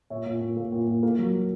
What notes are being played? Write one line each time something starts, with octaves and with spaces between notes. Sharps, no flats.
A#2 C#5 E5
A#2
A#2
A#3
A#2
A#2
A#3
F#3